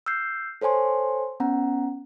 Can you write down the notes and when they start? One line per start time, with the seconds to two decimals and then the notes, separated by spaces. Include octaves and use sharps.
0.06 E6 F6 G6 C7
0.61 A4 C5 C#5 G#5 C6
1.40 B3 C#4 F#5 A#5